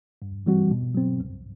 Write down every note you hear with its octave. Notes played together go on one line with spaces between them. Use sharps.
G2
E3 G3 C4 F#4
B2
F#3 C4
C2